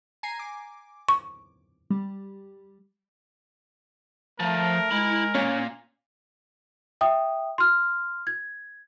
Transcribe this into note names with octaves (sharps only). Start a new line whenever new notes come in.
G#5 A#5 C7
D6
C#6
G3
F3 A3 A#4
G#3 E4 B5
A#2 C#4
E5 G5 D#6
C6 F6
G#6